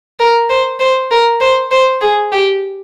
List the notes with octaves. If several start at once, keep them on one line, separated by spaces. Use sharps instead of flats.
A#4
C5
C5
A#4
C5
C5
G#4
G4